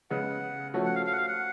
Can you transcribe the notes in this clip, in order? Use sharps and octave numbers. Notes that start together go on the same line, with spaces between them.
C#3 G#3 B3 F#5
F3 A3 C#4 F#4
F#5
F5
F5
F#5
F5
F#5